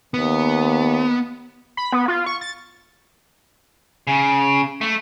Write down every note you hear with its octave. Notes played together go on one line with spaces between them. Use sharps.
D#2 B3
B5
B3
F4
C#6
A6
C#3
A3